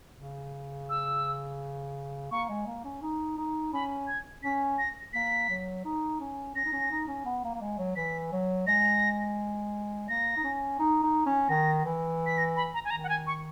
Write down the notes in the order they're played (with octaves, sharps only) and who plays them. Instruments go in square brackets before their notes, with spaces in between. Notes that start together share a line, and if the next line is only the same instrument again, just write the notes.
[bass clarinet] C#3
[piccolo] E6
[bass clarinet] A#3 [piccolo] C#6
[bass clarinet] G#3
A#3
C#4
D#4
D#4
[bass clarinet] C#4 [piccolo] B5
[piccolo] G#6
[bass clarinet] C#4 [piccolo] B6
[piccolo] A#6
[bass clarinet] A#3 [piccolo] B6
[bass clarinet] F#3
D#4
C#4
[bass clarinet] C#4 [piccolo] A#6
[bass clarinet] D#4
C#4
D#4
C#4
B3
A#3
A#3
G#3
F#3
[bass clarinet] E3 [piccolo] B6
[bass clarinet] F#3
[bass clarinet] G#3 [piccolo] A#6
[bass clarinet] A#3 [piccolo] A#6
[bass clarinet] D#4
C#4
D#4
D#4
C#4
[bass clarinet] D#3 [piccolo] A#6
[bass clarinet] E3
[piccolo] B6
A#6
B5
A#5
G#5
[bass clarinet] D#3 [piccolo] A#5
[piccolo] F#5
G#5
C#6